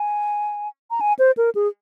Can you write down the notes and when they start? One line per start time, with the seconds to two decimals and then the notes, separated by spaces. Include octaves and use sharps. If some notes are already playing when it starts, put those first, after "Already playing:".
Already playing: G#5
0.91 A#5
1.01 G#5
1.19 C5
1.37 A#4
1.55 G#4